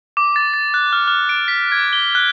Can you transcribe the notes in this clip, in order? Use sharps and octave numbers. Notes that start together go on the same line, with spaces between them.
D6
A6
A6
F#6
F6
F6
D7
B6
G#6
G7
F#6